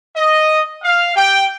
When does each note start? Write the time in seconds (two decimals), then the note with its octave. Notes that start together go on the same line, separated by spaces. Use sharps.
0.15 D#5
0.83 F5
1.15 G4 G5